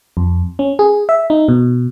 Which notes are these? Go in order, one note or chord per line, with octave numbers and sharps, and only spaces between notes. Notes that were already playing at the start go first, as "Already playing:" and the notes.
F2
C#4
G#4
E5
D#4
B2